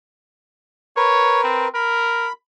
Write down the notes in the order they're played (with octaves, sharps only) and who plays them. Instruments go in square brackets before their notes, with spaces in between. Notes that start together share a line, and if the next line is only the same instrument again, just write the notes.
[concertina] A#4 B4 [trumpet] C#5
[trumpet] C4
[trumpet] A#4 [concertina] B5